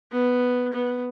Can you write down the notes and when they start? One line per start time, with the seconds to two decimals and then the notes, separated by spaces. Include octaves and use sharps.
0.12 B3
0.73 B3